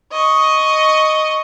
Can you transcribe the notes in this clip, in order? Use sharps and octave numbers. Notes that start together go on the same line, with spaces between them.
D#5 C#6